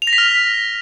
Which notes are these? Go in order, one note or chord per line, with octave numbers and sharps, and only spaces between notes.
F7
A#6
B6
F6